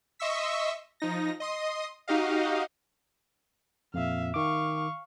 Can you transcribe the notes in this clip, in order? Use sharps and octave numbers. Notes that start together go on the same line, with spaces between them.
D#5 E5 C6 C#6 E6 B6
F3 D#4 A#6
D#5 C6 D#6
D#4 F#4 G4 D#5 F5
F2 A#2 E5 F5
D#3 F5 C#6 D6